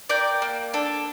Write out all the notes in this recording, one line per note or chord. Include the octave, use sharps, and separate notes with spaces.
A#4 D5 G5
A#3
D4 A4